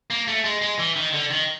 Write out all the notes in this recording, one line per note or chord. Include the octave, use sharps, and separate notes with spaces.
A#3
A3
G#3
G#3
E3
D#3
D3
D#3